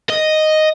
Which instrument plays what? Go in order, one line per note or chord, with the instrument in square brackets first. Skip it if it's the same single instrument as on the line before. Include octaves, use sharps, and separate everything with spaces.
[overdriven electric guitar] D#5